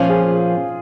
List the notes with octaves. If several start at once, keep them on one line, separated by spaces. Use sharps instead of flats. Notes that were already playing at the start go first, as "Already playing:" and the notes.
Already playing: A#2 F3 A#3 C#4 F4
G#4